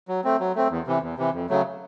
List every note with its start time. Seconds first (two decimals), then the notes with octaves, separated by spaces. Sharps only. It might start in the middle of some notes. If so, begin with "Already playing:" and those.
0.08 F#3
0.24 A3 C4
0.40 F#3
0.55 A3 C4
0.70 E2
0.87 C3 E3
1.02 E2
1.18 C3 E3
1.34 F2
1.49 C#3 F#3 A3